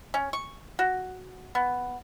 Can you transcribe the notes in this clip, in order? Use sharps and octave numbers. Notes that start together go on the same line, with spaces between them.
C#4
C#6
F#4
B3